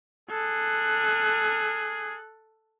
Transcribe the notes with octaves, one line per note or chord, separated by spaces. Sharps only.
G#4 A4 F#6